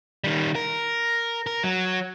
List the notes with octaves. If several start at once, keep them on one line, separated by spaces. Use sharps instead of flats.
D#3 G3
A#4
A#4
F#3